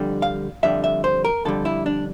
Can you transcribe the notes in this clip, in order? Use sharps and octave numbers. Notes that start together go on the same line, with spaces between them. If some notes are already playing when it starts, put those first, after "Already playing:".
Already playing: F2 D3 G3
F5
F2 D3 G3 E5
E5
C5
A#4
F2 D3 G3 A4
E4
D4